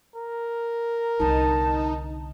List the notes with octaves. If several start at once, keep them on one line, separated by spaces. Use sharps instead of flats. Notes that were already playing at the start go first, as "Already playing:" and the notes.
A#4
C2 D3 D#4 A5